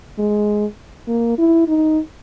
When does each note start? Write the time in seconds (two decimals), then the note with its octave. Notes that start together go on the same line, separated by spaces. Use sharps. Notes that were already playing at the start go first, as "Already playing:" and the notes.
0.19 G#3
1.08 A#3
1.38 E4
1.68 D#4